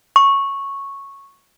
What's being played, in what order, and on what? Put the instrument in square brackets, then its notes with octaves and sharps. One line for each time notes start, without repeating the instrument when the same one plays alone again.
[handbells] C#6